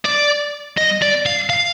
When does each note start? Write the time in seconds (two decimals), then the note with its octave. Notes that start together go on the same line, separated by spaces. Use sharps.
0.05 D5
0.78 D#5
1.02 D5
1.26 F5
1.50 F5